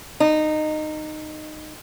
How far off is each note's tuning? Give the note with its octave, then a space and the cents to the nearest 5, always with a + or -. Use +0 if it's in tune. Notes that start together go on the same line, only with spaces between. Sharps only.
D#4 -15